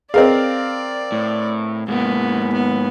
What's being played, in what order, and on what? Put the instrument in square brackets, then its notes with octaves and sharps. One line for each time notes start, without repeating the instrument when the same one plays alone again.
[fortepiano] C4 A#4 F5 [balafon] G#4 B4 D#5 [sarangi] D5
[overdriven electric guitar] A2
[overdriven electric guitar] G#2 A#3 [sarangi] B3
[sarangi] B3